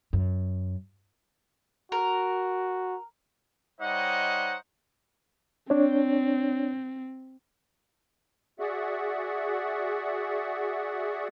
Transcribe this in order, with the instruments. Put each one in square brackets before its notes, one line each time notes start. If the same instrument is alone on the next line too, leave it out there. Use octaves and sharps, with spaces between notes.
[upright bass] F#2
[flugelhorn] F#4 [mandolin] A#4
[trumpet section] G3 D#4 C5 C#5 D#5 F#5
[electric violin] C4 [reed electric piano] D4 C#5
[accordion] F#4 G#4 D5 E5 F#5